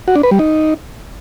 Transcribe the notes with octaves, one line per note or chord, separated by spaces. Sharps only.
F#4
D4
B4
G3
D#4